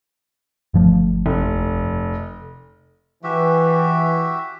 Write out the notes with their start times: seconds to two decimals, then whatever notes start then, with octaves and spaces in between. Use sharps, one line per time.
0.74 G1 F3 A3
1.26 F1
3.24 E3 F#4 G4 E5